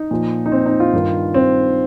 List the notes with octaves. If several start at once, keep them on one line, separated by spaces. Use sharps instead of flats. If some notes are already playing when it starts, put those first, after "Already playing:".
Already playing: D#4
A#2 F3
D#4
C4
D#4
F4
G2 D#3
C4